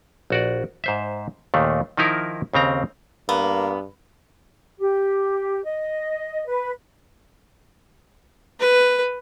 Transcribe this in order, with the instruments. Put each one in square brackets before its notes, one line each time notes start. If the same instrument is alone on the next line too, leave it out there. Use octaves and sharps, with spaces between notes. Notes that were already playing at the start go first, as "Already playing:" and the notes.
[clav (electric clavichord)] A#1 F#4 D5
G#2 C5 E5
D#2 A#2 D#3 A3
D#3 F3 D#4 E4 A#4
D#2 C#3 C4 A#5
[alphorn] G2 [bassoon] A#3 [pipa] B3
[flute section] G4
D#5
B4
[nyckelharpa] B4